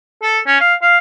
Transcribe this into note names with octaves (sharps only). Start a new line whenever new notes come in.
A4
C#4
F5
F5